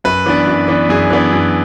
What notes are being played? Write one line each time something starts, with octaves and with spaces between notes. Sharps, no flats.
F#2 B4
E3 B3 D4
F#2
E3 B3 D4
F#2 G#4
E3 B3 D4
F#2